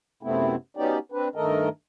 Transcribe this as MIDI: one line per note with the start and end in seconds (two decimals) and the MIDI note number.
0.23 0.56 42
0.23 0.56 48
0.23 0.56 57
0.23 0.56 59
0.23 0.56 60
0.23 0.56 64
0.77 0.98 54
0.77 0.98 59
0.77 0.98 61
0.77 0.98 63
0.77 0.98 67
0.77 0.98 74
1.12 1.29 60
1.12 1.29 62
1.12 1.29 71
1.35 1.69 43
1.35 1.69 51
1.35 1.69 57
1.35 1.69 69
1.35 1.69 70
1.35 1.69 75